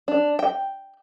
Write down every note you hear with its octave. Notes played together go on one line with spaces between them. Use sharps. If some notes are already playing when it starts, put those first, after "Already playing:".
D4
G5